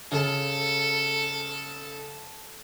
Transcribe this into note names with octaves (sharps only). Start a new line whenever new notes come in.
C#3 A4